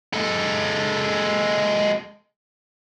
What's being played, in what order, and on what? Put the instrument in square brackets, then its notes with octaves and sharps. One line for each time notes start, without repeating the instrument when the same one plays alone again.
[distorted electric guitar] G#3 A4